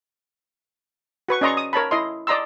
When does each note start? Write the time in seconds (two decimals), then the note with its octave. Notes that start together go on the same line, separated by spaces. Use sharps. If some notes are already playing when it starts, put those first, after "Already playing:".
1.28 F#4 B4 C#6
1.41 C#4 D5 D#5 A#5 C6 C#6
1.57 D#6
1.73 A#4 C#5 A5 B5
1.91 E4 D#5 C6
2.27 D5 D#5 A#5 C6 E6